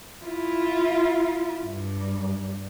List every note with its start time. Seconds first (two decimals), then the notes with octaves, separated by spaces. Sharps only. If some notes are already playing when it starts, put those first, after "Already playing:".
0.25 E4 F4
1.62 G2